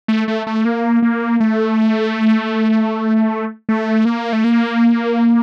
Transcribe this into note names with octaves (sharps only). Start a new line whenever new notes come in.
A3
A3
A3
A#3
A#3
A3
A3
A#3
A3
A#3